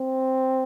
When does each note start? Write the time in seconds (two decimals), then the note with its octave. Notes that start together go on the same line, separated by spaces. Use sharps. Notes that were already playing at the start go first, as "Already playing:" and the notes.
Already playing: C4